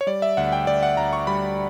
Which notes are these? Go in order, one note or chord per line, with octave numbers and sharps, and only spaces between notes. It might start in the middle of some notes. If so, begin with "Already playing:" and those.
C#5
G3 D5
E5
D2 F#5
G5
D2 D5
F#5
D2 A#5
C#6
G3 B5